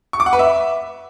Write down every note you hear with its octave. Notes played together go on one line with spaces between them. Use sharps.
C#6
D6
F#5
B4
E5